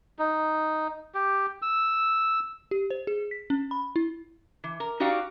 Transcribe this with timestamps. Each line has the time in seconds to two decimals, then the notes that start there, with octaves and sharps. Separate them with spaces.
0.19 D#4
1.14 G4
1.62 E6
2.71 G4
2.90 C5
3.07 G#4
3.31 B6
3.50 C#4
3.71 B5
3.96 E4
4.64 E3
4.80 A#4
5.00 D#4 F#4 G4 D5 F5